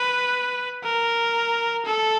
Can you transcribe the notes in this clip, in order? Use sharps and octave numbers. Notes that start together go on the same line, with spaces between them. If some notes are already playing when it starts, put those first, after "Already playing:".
Already playing: B4
A#4
A4